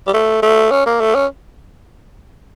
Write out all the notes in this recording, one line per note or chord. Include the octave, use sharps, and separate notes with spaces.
G3
A3
A3
C#4
A#3
A3
C#4